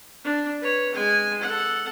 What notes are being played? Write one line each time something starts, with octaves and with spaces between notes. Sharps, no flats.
D4
B4 C#5
G#3 G#5
A4 F#5